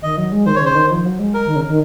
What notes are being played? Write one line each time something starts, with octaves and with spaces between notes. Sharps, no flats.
D#3 D#5
F#3
G#3
D#3 C5
C#5
C#3 C5
D#3
F3
F#3
G#3
A#4
D#3
C#3
D#3